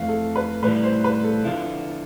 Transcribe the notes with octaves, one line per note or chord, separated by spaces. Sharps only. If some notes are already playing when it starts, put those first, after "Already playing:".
Already playing: F2 E3 A3 F5
A4
B4
A2 E3 G3 B4
C5
B4
A4
D3 F3 B3 E4 F4